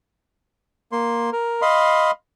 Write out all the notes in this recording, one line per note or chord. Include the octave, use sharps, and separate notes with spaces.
A#3 C6
A#4
D#5 F5 B5 C6